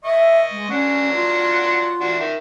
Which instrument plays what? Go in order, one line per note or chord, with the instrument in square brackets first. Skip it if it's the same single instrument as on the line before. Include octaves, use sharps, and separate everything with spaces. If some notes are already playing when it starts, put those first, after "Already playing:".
[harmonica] D#5 C#6 [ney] E5
[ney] G#3
[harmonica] F#3 D4 F#5 [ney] C#4
[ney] F4
[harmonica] E3 D4 F#4
D#3 E5